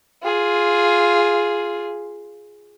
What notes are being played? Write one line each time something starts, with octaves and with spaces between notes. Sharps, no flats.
F4 G#4